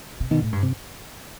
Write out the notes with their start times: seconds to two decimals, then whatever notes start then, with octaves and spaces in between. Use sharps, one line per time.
0.20 C3
0.31 B2 D#3
0.42 A2
0.52 G2
0.63 C3